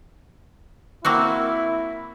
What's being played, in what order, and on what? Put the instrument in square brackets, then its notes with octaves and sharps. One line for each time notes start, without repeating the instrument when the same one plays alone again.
[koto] A#3 C4 F#4 [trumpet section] E4